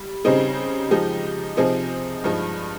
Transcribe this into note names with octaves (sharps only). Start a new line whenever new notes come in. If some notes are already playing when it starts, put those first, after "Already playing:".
Already playing: G3
C#3 G3 C4 D#4 G#4
F3 G#3 D#4 G4
C3 F3 C4 D#4 G#4
G2 F3 G#3 D#4